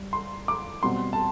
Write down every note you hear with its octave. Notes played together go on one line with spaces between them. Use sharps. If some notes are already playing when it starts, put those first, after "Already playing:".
Already playing: G3
C6
D6
B2 G3 C4 C6
A5